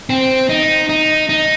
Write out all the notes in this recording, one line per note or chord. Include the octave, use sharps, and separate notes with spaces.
C4
D#4
D#4
D#4